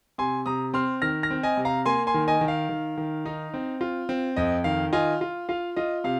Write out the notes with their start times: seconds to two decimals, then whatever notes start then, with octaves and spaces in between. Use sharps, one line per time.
0.18 C3 G#5 C6
0.46 C3 A#5 D#6
0.74 C4 C6 F6
1.02 D#3 F6 A#6
1.23 F6 A#6
1.31 C4
1.43 D#5 G#5
1.57 C3
1.65 F5 A#5
1.86 A#3 G#5 C6
2.07 G#5 C6
2.14 D#3
2.28 D#5 G#5
2.41 D#3
2.48 F5
2.69 D#3
2.97 D#3
3.26 D#4
3.54 C4
3.81 F4
4.09 C4
4.36 F2 D#5
4.64 D#3 F5
4.93 F4 D#5 G#5
5.21 F4
5.49 F4 F5
5.76 F4 D#5
6.04 C3 F5